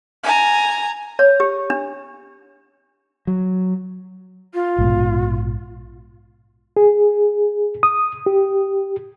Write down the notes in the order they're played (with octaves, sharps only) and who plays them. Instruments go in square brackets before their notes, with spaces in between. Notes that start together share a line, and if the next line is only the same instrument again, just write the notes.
[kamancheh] G#5 A#5
[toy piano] C#5
G4
D4
[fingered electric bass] F#3
[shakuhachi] F4
[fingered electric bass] A#1 G#2 B2
[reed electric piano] G#4
D#6
G4